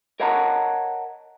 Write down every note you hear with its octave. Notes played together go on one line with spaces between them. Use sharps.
A#4 C#5 D#5 F#5 A5 A#5